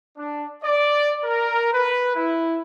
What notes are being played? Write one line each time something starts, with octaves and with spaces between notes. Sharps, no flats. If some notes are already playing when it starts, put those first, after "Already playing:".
D4
D5
A#4
B4
E4